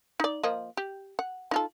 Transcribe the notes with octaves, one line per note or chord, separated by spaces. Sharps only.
D#4 D5
F3 A#3 D#5
G4
F#5
D#4 F4 A4